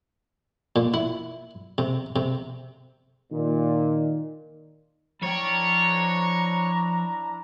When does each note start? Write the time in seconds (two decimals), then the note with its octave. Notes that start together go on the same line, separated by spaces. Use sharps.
0.76 A#2
0.94 E4
1.78 C3
2.16 C3
3.32 A#2 D#3
5.23 F3 D4 E4 C#5 G5 A#5